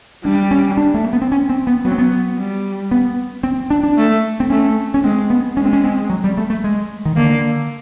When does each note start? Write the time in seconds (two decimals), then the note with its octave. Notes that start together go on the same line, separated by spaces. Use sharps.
0.24 G3 D4
0.51 C#4
0.77 D4
0.94 A3
1.04 A#3
1.13 B3
1.22 C4
1.32 C#4
1.49 C4
1.67 B3
1.85 F#3 B3
1.92 C4
1.98 B3
2.38 G3
2.91 B3
3.43 C4
3.70 D4
3.83 D4
3.97 A3
4.40 C4
4.50 A3 C#4
4.94 C#4
5.03 G#3 C4
5.30 B3
5.57 G#3 C#4
5.65 C4
5.73 C#4
5.84 C4
6.10 F#3
6.24 G3
6.37 A3
6.50 A3
6.64 G#3
7.05 D#3
7.16 D3 A#3